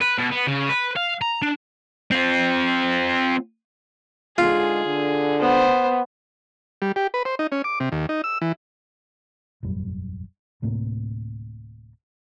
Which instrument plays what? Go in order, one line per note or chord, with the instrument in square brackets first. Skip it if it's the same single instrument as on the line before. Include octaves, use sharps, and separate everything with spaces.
[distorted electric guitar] B4
B2
B3
C#3
B4
F5
A#5
D4
C4 F4
[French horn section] G#2 D3 G#3 [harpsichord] F4 [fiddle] G#4
[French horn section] D3
[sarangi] B3 [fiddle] C5
[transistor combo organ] G3
G4
B4
C5
D#4
C#4
D6
C3
D#2
D#4
E6
E3
[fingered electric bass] E1 A1 F#2 G3
D1 A2 C3 A#3